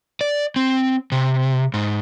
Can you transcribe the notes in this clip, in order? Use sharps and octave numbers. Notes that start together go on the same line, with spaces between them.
D5
C4
C3
G#2